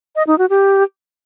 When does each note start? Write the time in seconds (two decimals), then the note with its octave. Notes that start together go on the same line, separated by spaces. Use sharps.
0.16 D#5
0.27 D#4
0.38 F#4
0.50 G4